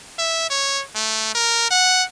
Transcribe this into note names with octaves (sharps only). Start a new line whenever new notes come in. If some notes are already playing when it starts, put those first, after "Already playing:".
E5
C#5
A3
A#4
F#5